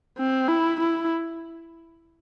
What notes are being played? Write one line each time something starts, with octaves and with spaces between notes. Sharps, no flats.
C4
E4
E4